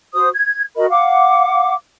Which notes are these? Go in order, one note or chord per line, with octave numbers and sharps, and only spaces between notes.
F#4 C5 D#6
G#6
F#4 A#4 D#5 B5
F5 F#5 D6